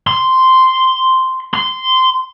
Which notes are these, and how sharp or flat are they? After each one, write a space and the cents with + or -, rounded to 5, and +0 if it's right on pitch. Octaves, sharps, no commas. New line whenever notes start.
C6 -5
C6 -15